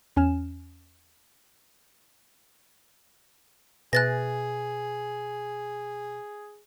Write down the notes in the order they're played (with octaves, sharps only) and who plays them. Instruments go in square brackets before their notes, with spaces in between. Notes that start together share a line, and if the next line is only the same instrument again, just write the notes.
[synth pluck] E2 C#4 G#5 F6 E7
[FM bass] B2 [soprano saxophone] G#4 [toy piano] B4 E5 G#5 [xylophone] F#6 A6 A#6